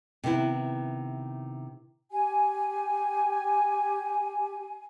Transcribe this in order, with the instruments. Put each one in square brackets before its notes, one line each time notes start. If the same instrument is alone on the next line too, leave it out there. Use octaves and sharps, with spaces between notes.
[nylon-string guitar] C3 D#3 B3 E4
[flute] G4 [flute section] G#5